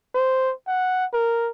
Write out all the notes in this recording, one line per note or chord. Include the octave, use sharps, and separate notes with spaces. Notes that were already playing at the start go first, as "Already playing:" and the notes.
C5
F#5
A#4